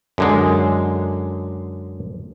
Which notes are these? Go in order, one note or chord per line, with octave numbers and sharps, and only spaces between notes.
F#2 D3 G#3